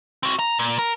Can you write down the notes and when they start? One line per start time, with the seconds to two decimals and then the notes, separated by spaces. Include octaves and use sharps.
0.23 C4 F#4
0.39 A#5
0.59 A#2
0.79 A#4